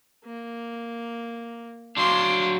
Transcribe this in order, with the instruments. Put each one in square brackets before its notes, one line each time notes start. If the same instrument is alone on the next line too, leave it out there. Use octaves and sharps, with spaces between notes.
[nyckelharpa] A#3
[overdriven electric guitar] F#3 D4 [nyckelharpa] F5 C6